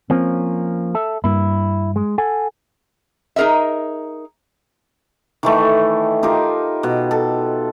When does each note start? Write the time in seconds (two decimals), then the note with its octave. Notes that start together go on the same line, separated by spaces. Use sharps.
0.10 F3 A#3 C4 C#4
0.95 A4 E5
1.24 G2 A#3 E4
1.96 G#3
2.18 A4 F#5 G#5
3.36 D#4 G#4 A#4 D#5 E5
5.43 D#3 E3 A3
6.23 D#4 F4 G4 A#4
6.83 B2
7.11 A4